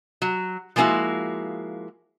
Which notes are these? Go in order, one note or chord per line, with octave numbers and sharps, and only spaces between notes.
F#3
F3 G#3 A#3 B3 E4 F#4